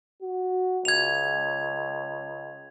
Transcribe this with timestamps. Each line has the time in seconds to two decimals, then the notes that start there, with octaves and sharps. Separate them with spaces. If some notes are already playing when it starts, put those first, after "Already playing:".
0.22 F#4
0.85 C#2 G#6 F7